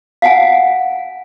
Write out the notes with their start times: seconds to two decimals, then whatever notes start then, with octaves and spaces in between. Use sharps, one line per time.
0.22 F5 F#5 G#5